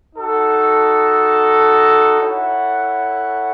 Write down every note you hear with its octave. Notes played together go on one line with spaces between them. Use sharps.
D#4 F#4 A4
E4 A4 C#5 F#5